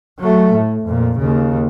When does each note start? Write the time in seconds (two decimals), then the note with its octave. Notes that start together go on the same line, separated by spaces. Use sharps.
0.19 F#3 A3
0.55 A2
0.86 F2 A#2
1.19 D#2 C#3